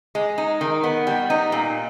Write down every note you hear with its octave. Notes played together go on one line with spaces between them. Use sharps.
G#3
D#4
D#3
B3
G3
D#4
A#2